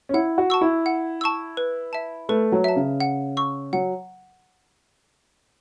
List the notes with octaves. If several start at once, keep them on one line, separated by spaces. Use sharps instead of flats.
C#4
E4 F#5
F#4
A5 C#6 E6
E4
F#5
A5 C#6 E6
B4
E5 A5
A3 B4
F#3
E5 A5
C#3
F#5
C#6 E6
F#3 F#5